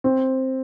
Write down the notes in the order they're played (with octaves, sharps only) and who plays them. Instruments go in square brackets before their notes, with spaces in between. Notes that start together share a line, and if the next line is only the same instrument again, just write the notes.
[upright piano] C4